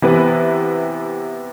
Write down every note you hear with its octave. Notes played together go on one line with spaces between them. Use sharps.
C3 E3 B3 E4 B4